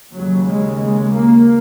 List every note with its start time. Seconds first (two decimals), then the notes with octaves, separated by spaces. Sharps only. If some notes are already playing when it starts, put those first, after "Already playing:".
0.14 D#2 C#3 F#3
0.48 G#3
0.81 G#3
1.14 A#3